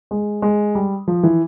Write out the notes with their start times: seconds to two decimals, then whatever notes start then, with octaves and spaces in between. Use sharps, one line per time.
0.11 G#3
0.42 G#3
0.75 G3
1.08 F3
1.23 E3